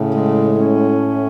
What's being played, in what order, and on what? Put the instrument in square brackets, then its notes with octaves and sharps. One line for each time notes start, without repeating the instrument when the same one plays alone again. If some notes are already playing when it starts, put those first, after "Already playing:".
Already playing: [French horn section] A2 [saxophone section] C#3
[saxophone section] G#3
C#4